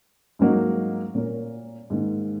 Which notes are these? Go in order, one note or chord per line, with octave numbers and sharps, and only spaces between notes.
G#2 F#3 A#3 F#4 D#5
A#2 A#3 C#4 A#4 C#5
G#2 D#3 A#3